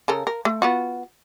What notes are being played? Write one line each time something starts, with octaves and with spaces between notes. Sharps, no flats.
C#3 A4 A#4
A#4
A3
B3 F4 F#4